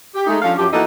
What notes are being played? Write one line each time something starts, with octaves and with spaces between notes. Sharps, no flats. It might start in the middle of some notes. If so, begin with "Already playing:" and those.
G4
G#3 A3 D#4
F3 C#4 D4 A4 F5
F#2 F3 F#3 G4
E3 A#3 B3 D#4 F#4 A4